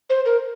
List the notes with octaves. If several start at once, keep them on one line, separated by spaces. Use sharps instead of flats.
C5
A#4